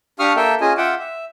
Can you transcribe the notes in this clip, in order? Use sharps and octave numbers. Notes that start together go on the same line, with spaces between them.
D4 G4 F5 C#6 D#6 F6
A#3 A4 E5 G5
C#4 F4 G#4 D#5 G#5
F4 E5 F#5 G5 D6
E5